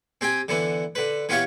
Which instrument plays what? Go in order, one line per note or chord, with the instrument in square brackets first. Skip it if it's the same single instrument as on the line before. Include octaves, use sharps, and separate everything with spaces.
[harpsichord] C4 G4 G5 G#5
D3 E3 B3
D3 B4
E3 B3 F4 G4 C#5 F5